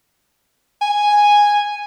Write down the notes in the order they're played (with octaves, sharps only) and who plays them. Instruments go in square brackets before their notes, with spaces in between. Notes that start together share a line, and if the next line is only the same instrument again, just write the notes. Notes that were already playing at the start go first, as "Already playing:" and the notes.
[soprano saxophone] G#5